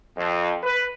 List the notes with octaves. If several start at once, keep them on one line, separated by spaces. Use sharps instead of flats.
F2
B4